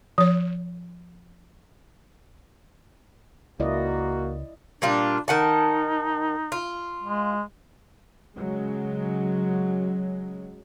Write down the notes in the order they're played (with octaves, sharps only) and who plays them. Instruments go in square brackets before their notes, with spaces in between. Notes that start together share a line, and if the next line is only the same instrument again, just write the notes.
[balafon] F3 C#5
[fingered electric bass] C#2 [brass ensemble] A#3 F#4 [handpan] E4 D5 D#5
[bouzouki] A#2 G3 F4 [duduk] D4
[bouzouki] D#3 F#5 A5 [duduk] D#4
[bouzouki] F4
[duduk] G#3
[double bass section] C#3 F#3 G#3